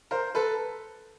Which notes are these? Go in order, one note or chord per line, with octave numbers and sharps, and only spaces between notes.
A#4 C5
A4 B4